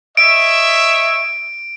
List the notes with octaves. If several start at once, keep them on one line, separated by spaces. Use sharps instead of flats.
C#5 D#5 E5 D7